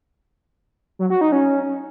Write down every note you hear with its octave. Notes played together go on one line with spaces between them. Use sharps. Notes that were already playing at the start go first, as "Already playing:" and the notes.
F#3
F#4
D#4
C#4